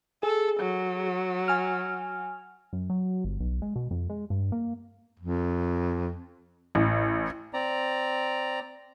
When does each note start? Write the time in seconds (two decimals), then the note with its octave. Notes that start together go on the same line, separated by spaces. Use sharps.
0.23 G#4 A4
0.60 F#3
1.48 G#5 F6
2.73 F#2
2.90 F#3
3.24 G1
3.40 B1
3.62 G#3
3.76 B2
3.91 F2
4.10 G#3
4.30 G2
4.52 A#3
5.20 F2
6.75 A1
7.53 C4 D5 A#5